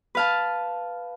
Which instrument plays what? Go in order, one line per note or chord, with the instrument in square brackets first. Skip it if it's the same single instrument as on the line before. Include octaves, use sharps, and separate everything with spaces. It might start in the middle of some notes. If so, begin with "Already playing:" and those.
[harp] B4 F5 A5